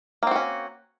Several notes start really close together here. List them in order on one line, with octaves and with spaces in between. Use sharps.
A#3 C4 F#4 C#4